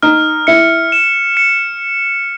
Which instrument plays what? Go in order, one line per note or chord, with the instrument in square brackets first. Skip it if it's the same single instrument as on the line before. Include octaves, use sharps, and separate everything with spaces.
[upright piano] D#4 [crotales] F6
[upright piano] E4 [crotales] C#7
[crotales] E7
C#7